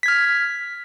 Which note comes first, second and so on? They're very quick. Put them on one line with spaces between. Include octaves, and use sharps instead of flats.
B6 G#6 F6